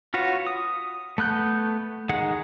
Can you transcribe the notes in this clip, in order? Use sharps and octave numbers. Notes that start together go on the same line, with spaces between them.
F4 F#4 B4 C#5
D#6
A3 B3 F#6 G6
D#3 G#3 G#4 F#5